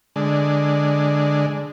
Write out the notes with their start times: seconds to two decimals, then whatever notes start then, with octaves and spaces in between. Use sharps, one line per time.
0.16 D3 G#3